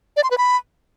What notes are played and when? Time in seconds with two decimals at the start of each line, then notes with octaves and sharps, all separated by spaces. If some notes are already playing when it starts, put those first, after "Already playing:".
0.17 D5
0.24 C6
0.31 B4
0.38 B5